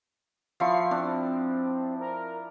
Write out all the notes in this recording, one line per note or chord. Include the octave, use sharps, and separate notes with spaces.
F3 E4 C#6 C7
C4 D4
A#4